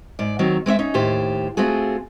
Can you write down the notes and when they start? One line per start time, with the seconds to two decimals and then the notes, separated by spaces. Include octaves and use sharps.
0.19 G#2 D5
0.39 D#3 F#3 C4
0.66 G#3 C4 C#5 E5
0.79 C#4 D#4
0.94 D#2 A2 G4 C5
1.57 A3 C4 F4 F#4 G#4